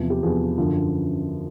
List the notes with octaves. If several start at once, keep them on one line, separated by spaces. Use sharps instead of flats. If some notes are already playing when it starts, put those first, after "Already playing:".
Already playing: E2 C3 F3
G4
E2 C3 F3 G#4
F#2 D3 F3